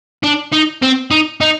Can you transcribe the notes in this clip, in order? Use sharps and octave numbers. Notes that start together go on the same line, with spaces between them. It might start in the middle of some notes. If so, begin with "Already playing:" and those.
D4
D#4
C4
D#4
D#4